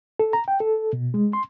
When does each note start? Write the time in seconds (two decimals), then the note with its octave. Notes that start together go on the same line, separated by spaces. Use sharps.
0.19 A4
0.33 A#5
0.48 G5
0.60 A4
0.93 B2
1.14 G#3
1.33 C6